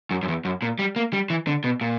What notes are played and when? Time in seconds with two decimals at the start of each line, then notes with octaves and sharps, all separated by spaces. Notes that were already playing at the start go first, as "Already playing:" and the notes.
0.11 F#2
0.23 F#2
0.28 E2
0.45 F#2
0.62 A#2
0.79 G3
0.96 A#3
1.13 G3
1.30 E3
1.47 D3
1.64 B2
1.81 A#2